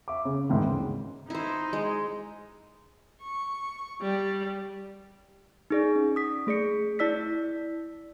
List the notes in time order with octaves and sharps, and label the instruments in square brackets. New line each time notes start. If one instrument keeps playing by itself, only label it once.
[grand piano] E5 D6
C#3
D2 G#2 D#3 E3
C#3
[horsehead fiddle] D#4 [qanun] E4 C5
[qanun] G#3
[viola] C#6
G3
[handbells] D#4 G#4 D5
C#4
D#6 B6
A3 G#4 D5 C#7
E4 D5 E6 B6